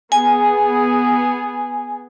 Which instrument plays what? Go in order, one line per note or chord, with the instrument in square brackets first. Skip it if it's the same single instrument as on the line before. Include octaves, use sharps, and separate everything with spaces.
[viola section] B3 G#4 [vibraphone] G#5